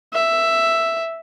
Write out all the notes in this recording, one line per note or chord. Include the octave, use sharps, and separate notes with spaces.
E5